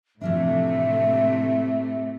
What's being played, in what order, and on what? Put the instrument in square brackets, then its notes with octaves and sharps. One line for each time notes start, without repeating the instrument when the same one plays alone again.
[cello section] A2 C3 A3 [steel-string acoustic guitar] E3 F3 D4 [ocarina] E5